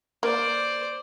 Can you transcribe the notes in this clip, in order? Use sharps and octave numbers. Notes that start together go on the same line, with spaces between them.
A#3 C5 D5